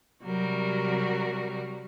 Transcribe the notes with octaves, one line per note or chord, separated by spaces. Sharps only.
C3 F#3 G3 F#4 A#4